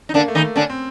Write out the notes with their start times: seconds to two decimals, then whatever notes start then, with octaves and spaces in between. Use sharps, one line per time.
0.09 D#4
0.14 D3 A#3 D4
0.28 A3
0.35 D#3 D#4
0.42 A3
0.56 D3 C#4 D4
0.70 C4